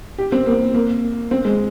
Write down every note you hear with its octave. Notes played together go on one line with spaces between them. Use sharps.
G4
C4
A#3
A#3
C4
G#3